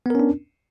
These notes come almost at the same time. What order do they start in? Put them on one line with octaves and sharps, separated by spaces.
B3 A#4 C#4 D4